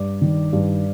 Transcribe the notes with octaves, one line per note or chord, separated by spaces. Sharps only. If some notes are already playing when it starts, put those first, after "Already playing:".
Already playing: G2 D5
D#3
G2